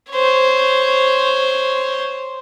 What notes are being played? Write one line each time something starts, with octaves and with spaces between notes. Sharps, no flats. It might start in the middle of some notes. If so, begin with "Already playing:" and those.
C5 C#5